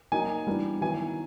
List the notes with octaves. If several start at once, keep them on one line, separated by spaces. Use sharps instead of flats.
F#3 A#3 D#4 G#5
E3 G3 B3 D4
D#3 F#3 B3 E4 G#5